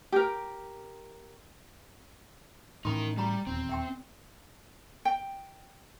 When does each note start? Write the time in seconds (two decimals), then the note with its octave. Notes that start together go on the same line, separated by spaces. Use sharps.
0.12 G4 A#4
2.85 A2 E3 C#4 D#4 A#4 B5 C6
3.17 G3 F#4 A#5 B5
3.47 D#1 E2 C4
3.69 E5 G5 C6
5.05 G5